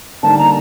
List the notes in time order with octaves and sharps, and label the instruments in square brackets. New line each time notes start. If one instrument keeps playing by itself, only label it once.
[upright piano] D3 G3 A#3 D#4 [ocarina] A5
[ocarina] A#5